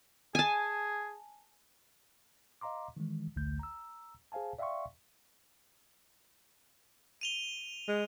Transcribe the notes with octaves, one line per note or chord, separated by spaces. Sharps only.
G#4 G#5 A5
D#5 F5 A#5 C6 D6
D#3 E3 G#3
A1 D2 D3 A3 G6
A#5 E6
G#4 C5 F5 G#5 A5
D5 E5 F5 G5 C6 C#6
D#7 F7 G7
G#3